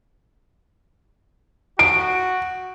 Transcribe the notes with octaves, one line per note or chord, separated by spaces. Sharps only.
F#4 D7